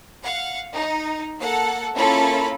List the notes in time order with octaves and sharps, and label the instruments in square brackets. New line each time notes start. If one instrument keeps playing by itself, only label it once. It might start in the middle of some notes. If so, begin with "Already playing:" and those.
[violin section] F5 F#5
D#4
A#3 A4 F#5
A#3 C#4 E4 F4 A4 B5